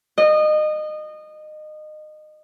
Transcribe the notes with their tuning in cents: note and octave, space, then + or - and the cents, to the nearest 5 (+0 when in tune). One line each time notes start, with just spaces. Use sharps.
D#5 -25